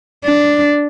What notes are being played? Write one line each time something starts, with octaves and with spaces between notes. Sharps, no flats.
D4